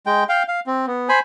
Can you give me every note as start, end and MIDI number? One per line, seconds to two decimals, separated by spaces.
0.06 0.24 56
0.06 0.24 79
0.29 0.43 77
0.29 0.43 79
0.48 0.60 77
0.67 0.86 60
0.87 1.09 59
1.09 1.20 72
1.09 1.20 80
1.09 1.20 83